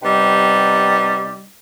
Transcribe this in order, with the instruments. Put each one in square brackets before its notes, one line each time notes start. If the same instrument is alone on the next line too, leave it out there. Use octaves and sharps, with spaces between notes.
[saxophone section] C3 G3 B3 D#4